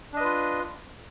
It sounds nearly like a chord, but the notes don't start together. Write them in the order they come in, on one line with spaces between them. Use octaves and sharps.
D4 D#5 B4 F4